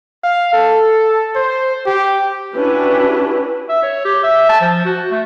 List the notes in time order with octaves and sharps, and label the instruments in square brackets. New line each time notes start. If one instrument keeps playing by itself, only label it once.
[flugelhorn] F5
A4
C5
G4
[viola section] C#4 D4 E4 F#4 G4 B4
[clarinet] E5
C#5
G4
E5
A5
F3
F#4
A3